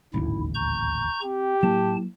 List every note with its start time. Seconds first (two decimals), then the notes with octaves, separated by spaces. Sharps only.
0.14 D#1 A1 D2 G#2 E4
0.55 A#5 C#6 G6
1.23 C4 G4
1.63 A2 F#3 A#3 A5